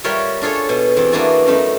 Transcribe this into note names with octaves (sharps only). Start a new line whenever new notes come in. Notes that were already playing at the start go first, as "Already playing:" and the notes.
G3 F4 A#4 C#5 E5
D4 F4 G#4 A4 C#5
B2
E2 C4
A#3 B3 D4 E4 F#4 A5
F#2 A3 D#4